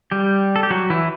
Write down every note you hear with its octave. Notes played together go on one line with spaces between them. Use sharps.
G3 G4
A4
G4
F#3 F#4
E3 E4